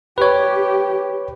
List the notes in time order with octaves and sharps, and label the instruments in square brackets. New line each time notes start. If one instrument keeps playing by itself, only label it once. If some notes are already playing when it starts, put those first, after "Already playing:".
[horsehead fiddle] G4 [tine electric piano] B4 C#5